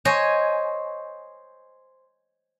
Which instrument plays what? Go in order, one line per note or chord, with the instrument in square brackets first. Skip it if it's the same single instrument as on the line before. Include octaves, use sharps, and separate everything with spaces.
[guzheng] C5 C#5 D#5 G#5